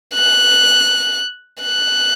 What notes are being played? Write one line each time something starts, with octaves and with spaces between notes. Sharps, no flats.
F#6
F#6